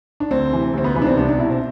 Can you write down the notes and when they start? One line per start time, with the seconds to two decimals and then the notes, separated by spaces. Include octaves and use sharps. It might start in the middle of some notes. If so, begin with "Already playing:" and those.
0.20 D4
0.31 D2 C4
0.53 C3 E3
0.74 D2 C4
0.84 B3
0.95 C3 E3 B3
1.02 D4
1.07 C4
1.17 C2 D4
1.29 D4
1.38 B2 E4
1.50 C4